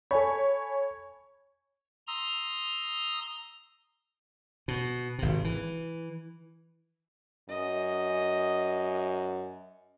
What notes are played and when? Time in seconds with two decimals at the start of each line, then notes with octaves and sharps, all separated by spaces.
0.11 A4 C#5 G#5 B5
2.07 A#5 C6 D#6 E6
4.68 B2
5.19 G#1 C3
5.44 E3
7.49 F#2 D#5